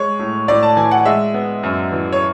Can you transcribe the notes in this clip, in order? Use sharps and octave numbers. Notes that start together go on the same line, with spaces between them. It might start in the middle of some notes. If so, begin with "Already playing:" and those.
Already playing: G#3 C#5
A2
A2 D5
A5
E3 G#5
F#5
G#3 E5
B3
F#2
E3
C#5